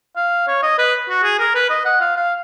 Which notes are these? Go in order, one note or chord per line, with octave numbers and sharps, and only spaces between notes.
F5
C#5
D#5
B4
F#4
G#4
A#4
B4
D#5
F#5
F5
F5